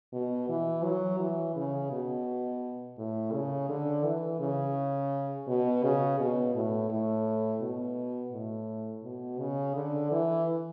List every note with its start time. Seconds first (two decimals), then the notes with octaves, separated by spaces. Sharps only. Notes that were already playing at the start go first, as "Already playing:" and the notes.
0.13 B2
0.49 E3
0.84 F#3
1.19 E3
1.56 C#3
1.92 B2
2.98 A2
3.33 C#3
3.69 D3
4.04 E3
4.40 C#3
5.48 B2
5.83 C#3
6.19 B2
6.55 A2
6.90 A2
7.61 B2
8.33 A2
9.04 B2
9.39 C#3
9.76 D3
10.11 E3